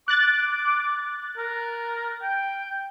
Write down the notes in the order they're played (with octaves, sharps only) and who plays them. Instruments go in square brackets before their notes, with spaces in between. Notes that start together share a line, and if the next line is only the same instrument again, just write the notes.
[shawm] D6 [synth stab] F#6 A6
[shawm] A#4
G5